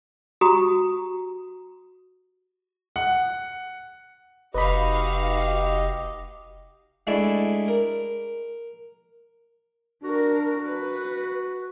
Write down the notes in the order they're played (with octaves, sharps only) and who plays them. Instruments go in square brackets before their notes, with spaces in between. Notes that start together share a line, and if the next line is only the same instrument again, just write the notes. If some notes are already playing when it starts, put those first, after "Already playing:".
[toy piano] F#4 G4 A#5 D#6
[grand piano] F#5
[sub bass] F1 [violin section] D#4 F#4 F5 [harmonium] G4 D#5 [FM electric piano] B4 B5
[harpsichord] G#3 A3 D4 E4 D5 E5
A#4
[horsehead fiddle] D4 A#4 [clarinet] F#4
[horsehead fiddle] B4